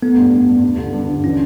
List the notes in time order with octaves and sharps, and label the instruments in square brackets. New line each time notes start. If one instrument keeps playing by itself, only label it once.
[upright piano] A3 [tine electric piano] B3
[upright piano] G2
G2
G2
G2
D3
G2
D3
[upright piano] E3 [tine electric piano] C#4